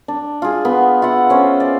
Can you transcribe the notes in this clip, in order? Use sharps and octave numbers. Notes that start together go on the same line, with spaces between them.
D4
F4 G#4
B3
F4 E5 F#5
C#4 C5
D5